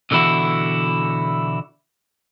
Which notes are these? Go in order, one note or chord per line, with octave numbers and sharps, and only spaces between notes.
B2 D3 E3 E4 F#4